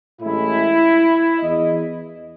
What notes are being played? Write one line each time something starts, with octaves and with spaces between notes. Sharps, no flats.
A1 A2 G#3 E4
E2 D#5